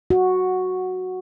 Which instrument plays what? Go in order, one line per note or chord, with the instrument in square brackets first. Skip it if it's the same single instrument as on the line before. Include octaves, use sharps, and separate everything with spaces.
[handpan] F#4